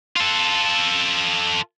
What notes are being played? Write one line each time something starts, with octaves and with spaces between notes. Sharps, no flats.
F4 A4